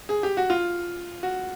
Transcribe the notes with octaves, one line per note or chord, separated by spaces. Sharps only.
G#4
G4
F#4
F4
F#4